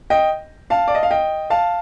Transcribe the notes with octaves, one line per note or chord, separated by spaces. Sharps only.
D#5 G5
F5 A5
D5
D#5
F5
D#5 G5
F5 A5